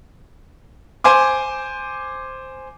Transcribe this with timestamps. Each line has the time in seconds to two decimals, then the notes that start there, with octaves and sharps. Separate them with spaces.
1.04 C5 G#5 C6 D6